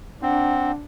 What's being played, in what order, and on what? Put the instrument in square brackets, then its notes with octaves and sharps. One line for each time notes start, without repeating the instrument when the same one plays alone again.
[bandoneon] C4 [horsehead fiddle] D4 [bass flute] F#5